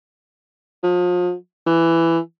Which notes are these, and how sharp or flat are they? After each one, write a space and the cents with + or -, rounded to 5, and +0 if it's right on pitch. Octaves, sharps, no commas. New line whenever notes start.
F3 +35
E3 +10